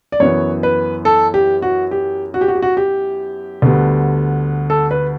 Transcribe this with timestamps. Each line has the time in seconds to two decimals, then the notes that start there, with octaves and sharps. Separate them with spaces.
0.12 D5
0.20 F#2 E3 B3 C#5
0.63 B4
1.05 A4
1.34 G4
1.62 F#4
1.91 G4
2.34 F#4
2.41 G4
2.48 F#4
2.55 G4
2.62 F#4
2.77 G4
3.62 D2 D3 G3 B3
4.70 A4
4.91 B4